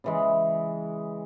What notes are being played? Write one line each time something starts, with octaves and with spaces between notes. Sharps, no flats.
C#3 E3 G#3